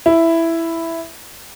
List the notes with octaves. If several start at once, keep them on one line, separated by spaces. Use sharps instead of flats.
E4